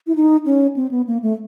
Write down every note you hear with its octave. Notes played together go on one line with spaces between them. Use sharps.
E4
D#4
C#4
C4
B3
A#3
A3